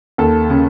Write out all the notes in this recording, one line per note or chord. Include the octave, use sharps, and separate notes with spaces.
D#2 A4
C#3